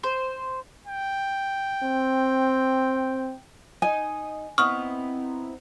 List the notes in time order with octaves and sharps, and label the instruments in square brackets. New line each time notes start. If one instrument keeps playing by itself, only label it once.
[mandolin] C5
[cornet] G5
[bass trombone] C4
[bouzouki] D#4 D#5 [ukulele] G#5 [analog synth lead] D#6
[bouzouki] B3 D#4 E4 [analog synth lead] C4 [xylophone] C#6 D#6 F6